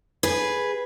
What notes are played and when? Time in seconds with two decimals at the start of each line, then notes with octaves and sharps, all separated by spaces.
0.23 G#4 B4